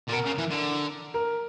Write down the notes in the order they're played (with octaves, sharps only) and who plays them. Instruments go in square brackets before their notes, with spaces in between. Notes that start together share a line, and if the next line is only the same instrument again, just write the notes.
[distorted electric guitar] A#2
[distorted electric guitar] B2 [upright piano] A#4
[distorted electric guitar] C#3
E3
D3
[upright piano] A#4